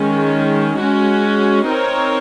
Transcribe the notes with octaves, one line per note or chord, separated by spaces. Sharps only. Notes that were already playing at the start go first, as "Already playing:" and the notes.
Already playing: D#3 G#3 C#4
G#3 C#4 F#4
C4 D#4 A#4 C#5